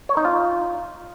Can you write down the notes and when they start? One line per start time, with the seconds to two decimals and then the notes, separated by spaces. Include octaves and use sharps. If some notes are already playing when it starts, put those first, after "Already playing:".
0.09 C#5
0.17 D#4
0.25 F4